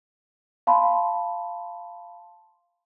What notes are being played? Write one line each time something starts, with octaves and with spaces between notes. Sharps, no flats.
F5 A5 B5 C6